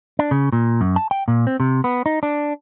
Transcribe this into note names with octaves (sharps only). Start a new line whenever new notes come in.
D4
C#3
A#2
F#2
A5
G5
A#2
C4
C3
B3
D#4
D4